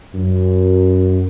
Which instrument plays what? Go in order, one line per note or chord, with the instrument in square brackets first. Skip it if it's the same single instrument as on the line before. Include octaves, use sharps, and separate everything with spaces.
[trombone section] F#2